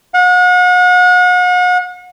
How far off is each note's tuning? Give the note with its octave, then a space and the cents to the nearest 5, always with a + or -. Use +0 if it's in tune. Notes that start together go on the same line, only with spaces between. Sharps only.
F#5 -40